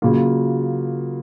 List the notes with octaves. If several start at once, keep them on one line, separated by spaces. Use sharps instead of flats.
C#3 F#3 A#3 F4